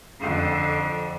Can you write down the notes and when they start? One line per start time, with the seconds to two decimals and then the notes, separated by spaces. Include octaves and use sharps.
0.21 F2 D3